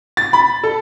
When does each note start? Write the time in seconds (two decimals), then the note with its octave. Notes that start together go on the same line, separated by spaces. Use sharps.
0.17 A6
0.33 B5
0.63 A4